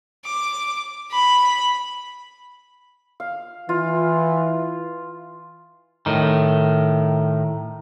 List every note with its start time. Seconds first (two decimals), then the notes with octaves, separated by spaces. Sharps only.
0.25 D6
1.11 B5
3.20 F5
3.69 E3 F4
6.06 A2 D#3